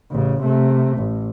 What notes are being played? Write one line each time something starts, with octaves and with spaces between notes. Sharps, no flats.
A1 C#3
C3 A3
A1